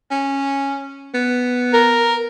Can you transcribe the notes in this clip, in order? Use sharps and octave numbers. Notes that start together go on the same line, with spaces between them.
C#4
B3
A#4